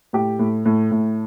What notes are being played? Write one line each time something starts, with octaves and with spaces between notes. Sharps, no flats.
A2 G4
A2
A2
A2